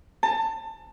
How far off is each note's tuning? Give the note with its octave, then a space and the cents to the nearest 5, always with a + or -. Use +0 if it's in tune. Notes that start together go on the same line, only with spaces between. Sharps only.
A5 +25